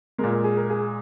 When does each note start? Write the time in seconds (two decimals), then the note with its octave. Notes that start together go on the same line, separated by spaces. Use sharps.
0.18 G#3 A#4
0.24 A#2
0.32 A#4
0.44 G#4
0.57 A#4
0.70 G#4